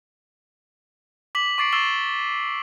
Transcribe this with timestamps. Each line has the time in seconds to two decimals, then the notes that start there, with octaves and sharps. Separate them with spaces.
1.35 D6 B6 F#7
1.58 C#6 D6 A6 C7 D7
1.72 C#6 E6 A6 C7 E7 G7